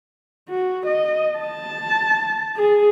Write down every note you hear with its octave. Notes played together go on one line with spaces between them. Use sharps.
F#4
D#5
A5
G#4